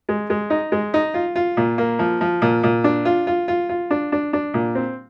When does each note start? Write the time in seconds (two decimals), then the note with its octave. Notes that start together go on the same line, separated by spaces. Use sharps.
0.09 G#3
0.30 G#3
0.50 D#4
0.72 G#3
0.94 D#4
1.14 F4
1.36 F4
1.57 A#2
1.78 A#3
1.99 F3
2.21 F3
2.42 A#2
2.63 A#2
2.84 D4
3.05 F4
3.27 F4
3.48 F4
3.69 F4
3.91 D4
4.12 D4
4.33 D4
4.54 A#2
4.75 C4